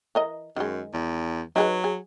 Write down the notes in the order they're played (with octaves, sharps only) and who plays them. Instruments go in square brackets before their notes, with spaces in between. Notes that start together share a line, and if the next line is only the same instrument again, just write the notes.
[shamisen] E3 A#4 D#5
[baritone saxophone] F#2 [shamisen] D#3 G#3
[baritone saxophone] E2
[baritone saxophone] F#3 [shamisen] D#4 G#4 B4
[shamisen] G#4